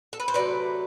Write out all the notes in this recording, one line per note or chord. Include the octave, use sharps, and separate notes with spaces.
A4
B4
C5
C3 F#3 A3 B4 D5